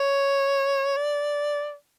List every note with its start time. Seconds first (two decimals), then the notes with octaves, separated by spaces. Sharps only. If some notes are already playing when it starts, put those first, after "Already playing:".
Already playing: C#5
0.97 D5